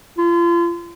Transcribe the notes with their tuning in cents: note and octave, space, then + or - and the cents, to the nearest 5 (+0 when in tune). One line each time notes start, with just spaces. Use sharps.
F4 -35